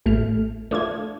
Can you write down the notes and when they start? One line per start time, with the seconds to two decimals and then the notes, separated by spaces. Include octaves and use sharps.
0.06 A1 A3 F6
0.71 A3 D4 F4 G#6